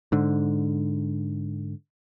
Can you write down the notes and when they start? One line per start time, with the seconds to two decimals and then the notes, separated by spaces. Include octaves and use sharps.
0.12 G#2 D3